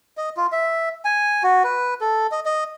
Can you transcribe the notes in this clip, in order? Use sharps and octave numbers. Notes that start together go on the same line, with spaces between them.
D#5
F4
E5
G#5
F#4
B4
A4
D#5
D#5